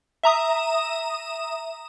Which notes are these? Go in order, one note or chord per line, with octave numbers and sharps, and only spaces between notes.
E5 A#5 D#6